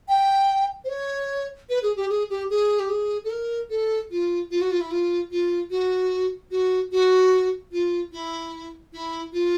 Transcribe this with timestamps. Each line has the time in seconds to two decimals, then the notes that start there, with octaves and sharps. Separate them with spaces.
0.08 G5
0.84 C5
0.89 C#5
1.69 B4
1.83 G#4
1.96 G4
2.09 G#4
2.30 G4
2.50 G#4
2.79 G4
2.89 G#4
3.24 A4
3.30 A#4
3.70 A4
4.11 F4
4.51 F4
4.61 F#4
4.71 F4
4.80 E4
4.91 F4
5.31 F4
5.70 F#4
6.51 F#4
6.92 F#4
7.72 F4
8.12 E4
8.93 E4
9.33 F4